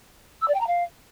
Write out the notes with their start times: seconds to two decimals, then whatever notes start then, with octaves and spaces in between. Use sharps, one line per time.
0.41 E6
0.48 D5
0.54 G5
0.61 A#5
0.67 F5